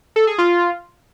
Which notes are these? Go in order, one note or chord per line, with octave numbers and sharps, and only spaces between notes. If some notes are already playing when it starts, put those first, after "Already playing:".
A4
G#4
F4